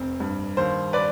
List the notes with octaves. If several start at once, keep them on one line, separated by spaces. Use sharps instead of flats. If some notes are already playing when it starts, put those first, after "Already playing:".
Already playing: F1 C4
G2
D#2 C5
B4 D5